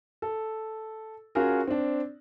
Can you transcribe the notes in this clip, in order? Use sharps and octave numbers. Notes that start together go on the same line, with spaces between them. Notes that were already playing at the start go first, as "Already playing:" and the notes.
A4
C#4 F4 F#4 G#4 A#4
C4 D4